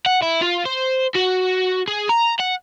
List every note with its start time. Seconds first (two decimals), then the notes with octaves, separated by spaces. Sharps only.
0.06 F#5
0.22 E4
0.42 F4
0.65 C5
1.15 F#4
1.88 G#4
2.09 A#5
2.39 F#5